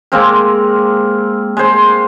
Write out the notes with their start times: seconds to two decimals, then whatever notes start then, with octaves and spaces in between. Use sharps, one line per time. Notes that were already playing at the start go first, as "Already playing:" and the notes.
0.12 G#3 A#3 C4 A#4
1.57 G#3 C5